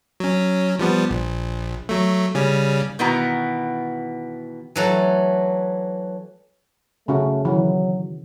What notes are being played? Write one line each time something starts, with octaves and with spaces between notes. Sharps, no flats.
F#3 C#4
F3 G3 B3
A#1
F#3 A3
C#3 G3 C#4
B2 D#3 E3 B3 F#4 A#5
E3 F#3 A3
C#3 A3 C#4 F#4
D#3 E3 F#3